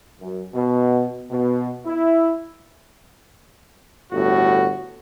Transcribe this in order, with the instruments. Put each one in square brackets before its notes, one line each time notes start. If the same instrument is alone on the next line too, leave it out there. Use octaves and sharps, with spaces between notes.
[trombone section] F#2
B2
B2
E4
[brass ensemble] G1 A2 F#4